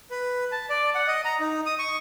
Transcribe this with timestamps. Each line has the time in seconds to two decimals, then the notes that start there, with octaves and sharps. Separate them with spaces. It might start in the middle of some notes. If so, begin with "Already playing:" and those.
0.11 B4
0.52 A5
0.70 D5
0.95 F#5
1.08 D#5
1.25 A#5
1.40 D#4
1.66 D#6
1.79 C#6